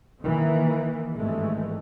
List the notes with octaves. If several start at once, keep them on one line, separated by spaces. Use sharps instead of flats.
D#3 E3 A#3
G#1 G2 E3 G#3 A3